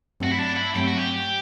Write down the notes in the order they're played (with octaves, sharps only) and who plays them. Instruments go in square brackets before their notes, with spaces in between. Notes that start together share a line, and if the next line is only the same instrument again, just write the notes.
[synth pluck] G2 F#3 A3 C4 [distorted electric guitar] F#4
[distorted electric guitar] E4
D4
E4
[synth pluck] G2 F#3 A3 C4 [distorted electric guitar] G4
[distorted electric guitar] F#4
G4